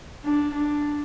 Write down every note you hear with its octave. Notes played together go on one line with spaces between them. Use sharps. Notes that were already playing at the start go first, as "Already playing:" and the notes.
D4
D4